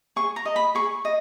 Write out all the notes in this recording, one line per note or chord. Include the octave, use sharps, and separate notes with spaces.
G#4 C#6
A#5
D#5
B5
G#4 C#6
D#5